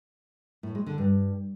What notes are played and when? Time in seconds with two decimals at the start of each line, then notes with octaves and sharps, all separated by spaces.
0.63 A2
0.75 G#3
0.86 D3
0.98 G2